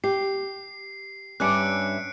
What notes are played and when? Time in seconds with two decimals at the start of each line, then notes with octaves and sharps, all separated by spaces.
0.04 G4 C7
1.40 G2 C#4 D5 E5 F#6 C#7 D7